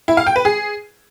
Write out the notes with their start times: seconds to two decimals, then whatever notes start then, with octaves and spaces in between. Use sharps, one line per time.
0.08 E4
0.17 F5
0.27 G5
0.36 B4
0.45 G#4